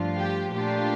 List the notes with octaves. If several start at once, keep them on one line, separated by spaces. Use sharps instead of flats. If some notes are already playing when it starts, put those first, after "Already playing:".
Already playing: G2 F3 A3 D4 F4
G4
A#2 A3 D4 F4 G4